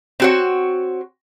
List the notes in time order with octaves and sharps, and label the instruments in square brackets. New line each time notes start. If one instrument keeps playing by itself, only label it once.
[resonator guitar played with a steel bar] C4 F#4 C#5